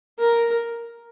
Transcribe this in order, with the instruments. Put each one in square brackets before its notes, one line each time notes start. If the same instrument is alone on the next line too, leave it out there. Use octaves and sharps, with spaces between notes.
[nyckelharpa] A#4